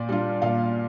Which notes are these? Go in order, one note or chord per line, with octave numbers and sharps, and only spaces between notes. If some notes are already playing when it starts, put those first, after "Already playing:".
Already playing: A#2 D5
G3 D4 F4
A#2 F5